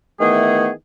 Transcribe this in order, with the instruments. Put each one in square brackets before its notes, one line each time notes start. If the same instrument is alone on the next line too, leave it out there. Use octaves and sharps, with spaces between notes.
[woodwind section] D#3 E3 A3 B3 G#4